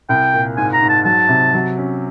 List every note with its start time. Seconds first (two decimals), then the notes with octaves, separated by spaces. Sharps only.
0.09 C2 G5
0.34 A#2
0.57 G#2 G#5
0.73 A#5
0.82 G#2
0.89 A5
1.05 F#3 A5
1.29 C3
1.54 F#3
1.78 C#4